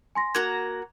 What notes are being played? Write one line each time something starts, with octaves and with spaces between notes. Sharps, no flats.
G#5 C6 A#6
A#3 F#4 A#5 G#6